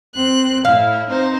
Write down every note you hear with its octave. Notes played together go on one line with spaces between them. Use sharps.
C4 F#6
A2 E4 F5
C4 D#4 C5